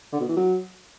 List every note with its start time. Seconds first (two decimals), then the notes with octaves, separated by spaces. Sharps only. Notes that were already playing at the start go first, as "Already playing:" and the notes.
0.12 D3
0.20 B2
0.28 E3
0.36 F#3